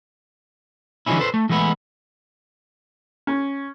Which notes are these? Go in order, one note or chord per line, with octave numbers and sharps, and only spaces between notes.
D3 E3 F3 G#3 C#4 E4
A4 B4 C5
A3
E3 G#3 A3 B3 E4
C#4